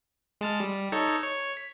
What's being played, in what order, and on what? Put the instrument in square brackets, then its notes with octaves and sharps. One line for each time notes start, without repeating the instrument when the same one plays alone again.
[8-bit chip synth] G#3 A5 F6
G3
D#4 A4 C#5
C#5
B6